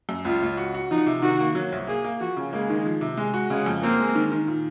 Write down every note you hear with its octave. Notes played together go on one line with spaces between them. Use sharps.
F#2
C#2 F4
C#2
F#4
F#4
F3 D#4
C3
D#3 F#4
A#3
F#3
C2
A#3 G#4
A#3
F3 F#4
C#3
G#3 A#3
D#3
F3
C3
G#3
F#4
C#3 G#3
F2
A#3 C4
G#3
D#3
D#3
A#2